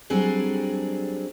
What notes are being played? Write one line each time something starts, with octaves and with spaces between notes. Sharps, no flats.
F#3 G3 C4 D4 G#4 A4